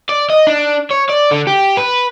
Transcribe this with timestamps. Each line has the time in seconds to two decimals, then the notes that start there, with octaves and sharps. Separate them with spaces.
0.09 D5
0.30 D#5
0.47 D4
0.91 C#5
1.10 D5
1.31 D3
1.47 G4
1.77 B4